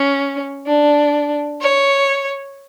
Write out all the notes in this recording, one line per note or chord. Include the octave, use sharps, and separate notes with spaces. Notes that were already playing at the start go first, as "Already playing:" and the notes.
Already playing: C#4
D4
C#5